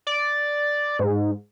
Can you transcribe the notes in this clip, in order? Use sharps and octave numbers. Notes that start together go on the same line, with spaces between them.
D5
G#2